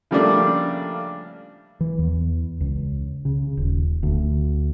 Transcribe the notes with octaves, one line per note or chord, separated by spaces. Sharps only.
C#3 F3 G3 A3 A#3 D4
E3
E2
C#2
C#3
D#1
D2